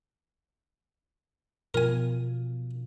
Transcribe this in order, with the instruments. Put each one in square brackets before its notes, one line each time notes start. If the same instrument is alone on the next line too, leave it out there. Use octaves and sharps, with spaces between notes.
[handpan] B2 F3 F4 [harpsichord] A#4 G#5